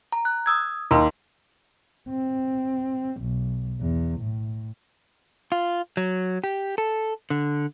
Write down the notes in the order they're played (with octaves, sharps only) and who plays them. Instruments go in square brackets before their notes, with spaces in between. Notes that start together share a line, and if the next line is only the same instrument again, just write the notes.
[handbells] A#5
F#6
D#6 E6 G#6
[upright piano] D#2 [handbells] A#5 C6
[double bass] C4
B1
E2
A2
[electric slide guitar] F4
F#3
G4
A4
D3